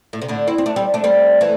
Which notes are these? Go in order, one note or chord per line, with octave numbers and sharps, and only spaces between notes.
A2
C3
A2 D3
C4 E4
C4
A3 D4
G3 C4
A3 D4
G3 C4
E3 A3